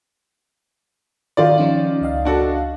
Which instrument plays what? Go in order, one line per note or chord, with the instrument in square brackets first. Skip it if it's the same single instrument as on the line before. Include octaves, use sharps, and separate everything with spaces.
[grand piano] D#3 F4 D5
[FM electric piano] F3 C#4 D#4
C#2 D#5 F5
[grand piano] D4 F#4 A4